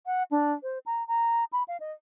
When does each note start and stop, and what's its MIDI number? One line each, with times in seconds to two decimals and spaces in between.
0.06 0.23 78
0.31 0.53 62
0.63 0.79 72
0.86 1.06 82
1.08 1.44 82
1.53 1.63 83
1.68 1.80 77
1.80 1.92 75